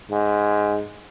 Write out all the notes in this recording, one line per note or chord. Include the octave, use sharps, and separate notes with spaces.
G#2